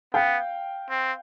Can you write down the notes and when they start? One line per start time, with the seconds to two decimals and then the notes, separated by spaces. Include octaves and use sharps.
0.14 B3 F5 G5
0.90 C4